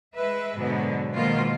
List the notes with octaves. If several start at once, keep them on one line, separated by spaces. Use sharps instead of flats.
G#3 B4 E5
G#2 B2 D3 F#3 B3
G#2 B2 D#3 F3 A#3 F4